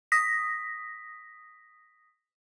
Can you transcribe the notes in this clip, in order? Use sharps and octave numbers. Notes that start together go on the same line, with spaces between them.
D#6 A#6 B6